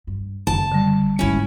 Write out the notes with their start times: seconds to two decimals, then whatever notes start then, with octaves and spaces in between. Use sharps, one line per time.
0.07 G2
0.47 F#1 A5
0.72 D3 G3
1.19 E1 G#2 C#4 E4